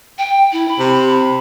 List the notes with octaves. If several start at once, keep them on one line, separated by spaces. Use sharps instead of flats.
G5
E4
B5
C3